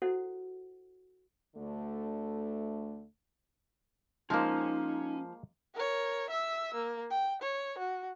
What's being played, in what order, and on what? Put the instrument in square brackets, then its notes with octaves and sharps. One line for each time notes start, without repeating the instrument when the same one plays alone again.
[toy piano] E4 F#4 A4 C5 F#5
[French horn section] D2 D3 A3
[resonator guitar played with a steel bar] F3 C5 [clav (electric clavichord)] G#3 A#3 [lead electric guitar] C#4 G#5 [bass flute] D#4
[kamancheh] A#4 C#5
E5 E6
A#3
G5
C#5
F#4